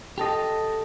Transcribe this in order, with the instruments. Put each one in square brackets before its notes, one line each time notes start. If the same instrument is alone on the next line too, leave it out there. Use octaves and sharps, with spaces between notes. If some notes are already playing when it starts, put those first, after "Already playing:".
[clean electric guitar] G4 A4 D#5